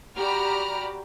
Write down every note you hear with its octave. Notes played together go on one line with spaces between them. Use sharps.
F#4 G4 D5 A#5 B5 F6